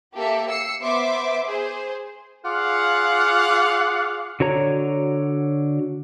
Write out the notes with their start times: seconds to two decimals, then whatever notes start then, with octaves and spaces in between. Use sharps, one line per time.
0.14 A#3 G4 A4 E5
0.49 E6 C7 C#7
0.81 B3 C5 E5 C6 D6
1.45 G#4 C5
2.44 F4 G#4 D5 F5 F#5
4.40 D3 F#4 C#5 A#5